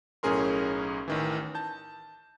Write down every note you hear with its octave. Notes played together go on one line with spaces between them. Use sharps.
B1 A2 C#4 G#4 A#4 C6
A1 D#3 E3
A5 G6